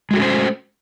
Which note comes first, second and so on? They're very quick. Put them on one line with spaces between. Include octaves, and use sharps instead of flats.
G#3 F#4 A3 C#4 C5